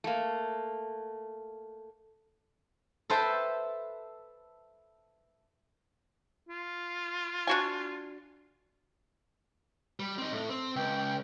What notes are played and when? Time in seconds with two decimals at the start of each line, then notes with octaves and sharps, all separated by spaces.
0.04 A3 A#3
3.10 A4 B4 C5 E5 G5 A5
6.49 F4
7.47 D4 F#4 G#5
10.00 G3
10.18 C4 D#4
10.33 A2
10.50 C4
10.76 C#2 G5